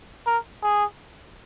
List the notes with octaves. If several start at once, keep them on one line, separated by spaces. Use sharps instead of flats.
A#4
G#4